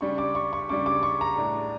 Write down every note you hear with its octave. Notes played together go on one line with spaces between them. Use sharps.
C#3 G3 D4 C#6
D6
C#6
C#6
C#3 G3 D4 D6
D6
C#6
A#5
A2 G3 D4